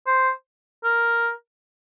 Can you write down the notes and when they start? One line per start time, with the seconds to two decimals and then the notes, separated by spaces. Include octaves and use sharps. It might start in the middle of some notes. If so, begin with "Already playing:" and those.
0.07 C5
0.84 A#4